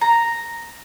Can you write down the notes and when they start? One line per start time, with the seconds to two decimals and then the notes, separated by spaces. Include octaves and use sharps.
0.01 A#5